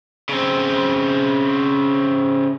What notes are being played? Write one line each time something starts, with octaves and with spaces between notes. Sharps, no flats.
C#3 C4